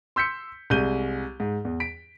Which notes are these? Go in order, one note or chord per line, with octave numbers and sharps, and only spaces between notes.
C6 E6 G6 B6 C#7
C2 G#3 G6 D#7 G7
G#2
E2
B6 D7